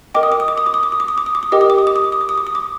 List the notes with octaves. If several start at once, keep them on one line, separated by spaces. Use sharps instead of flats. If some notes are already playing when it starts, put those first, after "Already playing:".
A#4 D#5 G5 D6
D#6
D6
D#6
D6
D#6
D6
D#6
D6
D#6
D6
D#6
D6
D#6
D6
D#6
G4 A#4 D#5 G5 D6
D#6
D6
D#6
D6
D#6
D6
D#6
D6
D#6
D6
D#6
D6